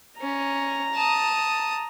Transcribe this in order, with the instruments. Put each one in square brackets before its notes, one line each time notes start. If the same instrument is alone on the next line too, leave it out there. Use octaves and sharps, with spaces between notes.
[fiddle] C#4 [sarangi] A#5
[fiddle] A5 D#6